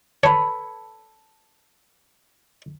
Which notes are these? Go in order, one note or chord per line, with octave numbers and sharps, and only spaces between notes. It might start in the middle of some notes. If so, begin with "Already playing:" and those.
A4 B4 C#5